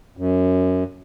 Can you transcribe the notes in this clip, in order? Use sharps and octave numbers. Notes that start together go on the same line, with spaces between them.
F#2